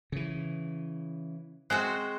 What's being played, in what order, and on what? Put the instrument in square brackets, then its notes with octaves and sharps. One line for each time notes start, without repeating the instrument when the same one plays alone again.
[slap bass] C#3 E3
[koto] G#3 C4 F#4 [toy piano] C5 G#5